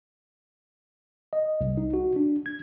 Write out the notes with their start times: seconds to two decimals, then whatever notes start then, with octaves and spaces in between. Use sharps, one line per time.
1.33 D#5
1.61 C2
1.77 D#4
1.94 F#4
2.16 D4
2.46 G#6